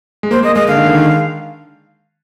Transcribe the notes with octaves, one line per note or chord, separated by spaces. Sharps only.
G#3
A#3 C5
A#3 D#5
G#3 D#5
D3 F5
D#3
D3
D#3